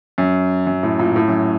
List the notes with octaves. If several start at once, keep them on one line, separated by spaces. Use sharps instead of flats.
F#2
F#2
A2
A#2
A2
F#2